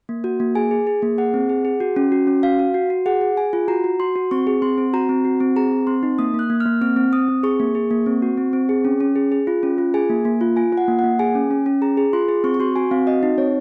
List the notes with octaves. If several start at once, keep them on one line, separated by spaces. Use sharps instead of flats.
A#3
F#4
A#3
G#4 G#5
G#4
G#4
A#3
G#4 F#5
C4
G#4
G#4
F#4
C#4
F#4
C#4
F#4 F5
F#4
F#4
F#4
G#4 F#5
G#4
G#4 G#5
F4
F#4 A#5
F#4
F#4 C6
F#4
C4 C#6
G#4
C4 C6
C4
F#4 A#5
C4
F#4
C4
G#4 A#5
C4
C4 C6
D#4
A#3 D#6
A#3
F#6
A#3
F6
A#3
C4 F6
C4
C4 D#6
C4
G#4 C#6
A#3
G#4
A#3
C4
F#4
C4
C4
G#4
C#4
C#4
G#4
G#4
F4
C#4
F4
G#4 G#5
A#3
A#3
F4
F4 G#5
F4 F#5
A#3
A#3 F#5
G#4 G#5
C#4
C#4
C#4
G#4 A#5
G#4
F4 C6
G#4
C4 C#6
C#6
F#4 C6
F#4 G#5
C4 F5
F#4 D#5
D#4
C4 C#5